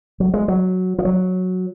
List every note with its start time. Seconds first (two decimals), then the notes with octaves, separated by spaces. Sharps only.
0.20 F#3
0.34 G#3
0.48 F#3
0.98 F3
1.05 F#3